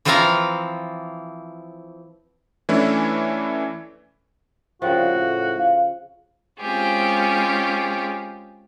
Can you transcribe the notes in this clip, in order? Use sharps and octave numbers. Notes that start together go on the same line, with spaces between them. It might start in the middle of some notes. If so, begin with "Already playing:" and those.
E3 F3 C4 F4 F5 A#5
E3 A3 C#4 D4 E4
C2 C#3 F3 F#4 G5
A2
F5
G#3 C4 C#4 F4 G4 G#4